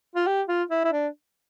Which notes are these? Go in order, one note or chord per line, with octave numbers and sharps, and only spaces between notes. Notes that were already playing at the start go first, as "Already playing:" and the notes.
F4
G4
F4
E4
E4
D4